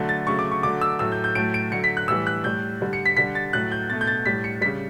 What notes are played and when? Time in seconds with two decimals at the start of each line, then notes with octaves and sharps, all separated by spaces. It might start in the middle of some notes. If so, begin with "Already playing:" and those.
Already playing: D3 F#3 A3
0.09 A6
0.27 C#3 F#3 A3 C#6
0.39 D6
0.51 C#6
0.63 D3 F#3 A3 D6
0.81 E6
0.99 A2 F#3 A3 E6
1.12 G6
1.24 G6
1.35 A2 F#3 A3 D7
1.54 D7
1.72 D3 F#3 A3 C#7
1.84 B6
1.97 F#6
2.08 A2 E3 G3 E6
2.27 F#6
2.44 A2 G3 G6
2.81 D3 G3
2.93 C#7
3.06 B6
3.17 D3 G3 B6
3.35 A6
3.53 A2 F#3 A3 F#6
3.72 G6
3.90 B2 A3 A6
4.01 G6
4.07 A6
4.26 A2 G3 B6
4.44 C#7
4.61 C#3 G3 B6